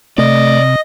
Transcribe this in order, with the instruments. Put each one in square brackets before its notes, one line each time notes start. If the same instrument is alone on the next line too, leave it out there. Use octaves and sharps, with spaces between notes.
[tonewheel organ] C3 [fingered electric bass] A3 [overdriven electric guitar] D5 [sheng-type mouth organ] D#5